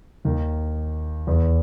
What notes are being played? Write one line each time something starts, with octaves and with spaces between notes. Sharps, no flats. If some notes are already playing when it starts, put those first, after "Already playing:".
D#2 D#3
E2 E3